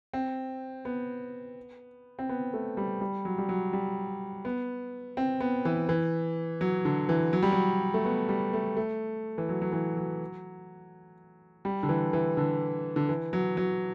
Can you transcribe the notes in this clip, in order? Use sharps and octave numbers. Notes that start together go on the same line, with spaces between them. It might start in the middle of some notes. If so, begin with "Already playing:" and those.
C4
B3
C4
B3
A3
G3
G3
F#3
G3
F#3
G3
B3
C4
B3
E3
E3
F#3
D3
E3
F#3
G3
F#3
A3
B3
G3
A3
A3
E3
F#3
F#3
E3
F#3
G3
D3
E3
E3
D3
D3
E3
F#3
F#3